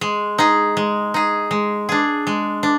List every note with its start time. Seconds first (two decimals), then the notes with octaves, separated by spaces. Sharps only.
0.01 G#3
0.38 D#4 G#4
0.77 G#3
1.14 D#4 G#4
1.51 G#3
1.89 D4 G#4
2.27 G#3
2.63 D4